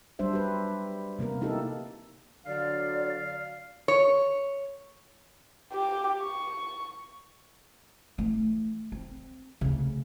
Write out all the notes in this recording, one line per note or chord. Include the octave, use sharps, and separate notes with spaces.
F#3 G3 D4 C5 E5
G4 B4
C3 A#3 B3 A#4
A#3 D#4 E4 G4 A4
D3 F#3 D5 F5
C#5
G4
C#6
E3 A3
C4
D2 C#3